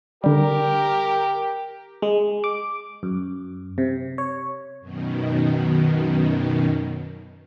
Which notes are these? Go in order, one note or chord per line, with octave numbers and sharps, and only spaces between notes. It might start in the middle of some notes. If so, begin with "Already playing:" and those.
D3 G3 G4 A#4
G#3
D6
F#2
C3
C#5
F#2 B2 D#3